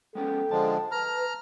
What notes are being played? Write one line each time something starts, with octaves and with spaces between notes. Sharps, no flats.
G#3 B3 C#4 A4 G5
D3 F3 G#3 A5
B4 A#5 F6